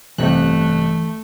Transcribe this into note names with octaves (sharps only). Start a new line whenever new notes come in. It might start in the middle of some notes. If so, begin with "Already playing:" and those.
A1 G2 C3 E3 A3 F5 F#6